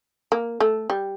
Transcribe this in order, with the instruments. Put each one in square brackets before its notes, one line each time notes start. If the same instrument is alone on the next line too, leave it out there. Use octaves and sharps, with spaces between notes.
[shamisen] A#3
A3
G3